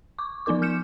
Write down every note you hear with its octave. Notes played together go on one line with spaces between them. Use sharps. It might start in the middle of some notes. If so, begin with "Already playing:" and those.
C#6 D6
F3 B3 D#4 A#4 D6
F6 G6 C#7 E7